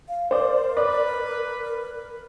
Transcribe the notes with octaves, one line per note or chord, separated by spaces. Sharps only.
F5
A#4 C5 D5
B4 D5